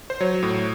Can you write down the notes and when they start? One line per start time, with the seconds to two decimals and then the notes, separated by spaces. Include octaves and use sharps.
0.10 C5
0.20 F#3 C#5
0.43 A2